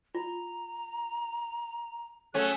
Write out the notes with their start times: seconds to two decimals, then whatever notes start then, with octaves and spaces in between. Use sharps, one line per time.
0.15 F4 A#5
2.34 F#3 A3 C#4 G#4 A4 F#6